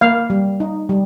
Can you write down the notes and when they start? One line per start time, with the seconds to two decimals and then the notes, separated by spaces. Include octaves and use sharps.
0.01 A#3 F5
0.30 G3
0.60 D#4
0.89 G3